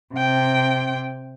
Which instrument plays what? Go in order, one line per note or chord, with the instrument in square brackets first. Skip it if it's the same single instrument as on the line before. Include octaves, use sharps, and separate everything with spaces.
[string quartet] C3 G5